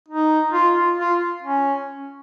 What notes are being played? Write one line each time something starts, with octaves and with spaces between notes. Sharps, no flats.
D#4
F4
F4
F4
C#4